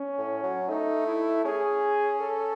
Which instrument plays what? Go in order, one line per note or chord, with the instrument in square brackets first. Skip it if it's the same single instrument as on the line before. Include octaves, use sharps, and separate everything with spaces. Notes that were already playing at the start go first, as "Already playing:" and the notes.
Already playing: [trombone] C#4
[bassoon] A2
F#3
[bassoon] A3 [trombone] D#4
[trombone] E4
[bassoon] C#4 [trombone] G#4
[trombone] A4